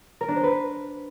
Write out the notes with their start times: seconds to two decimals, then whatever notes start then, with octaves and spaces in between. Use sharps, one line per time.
0.21 A#4
0.28 D4
0.36 C5
0.44 B4